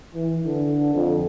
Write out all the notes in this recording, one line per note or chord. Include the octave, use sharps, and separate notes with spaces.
E3
D3
F2